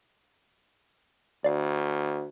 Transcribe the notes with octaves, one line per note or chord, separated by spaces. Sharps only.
D2 D5 F5